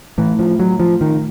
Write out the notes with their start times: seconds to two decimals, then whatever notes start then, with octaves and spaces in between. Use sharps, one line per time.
0.18 A2 E3
0.39 F3
0.59 F#3
0.80 F3
1.01 D#3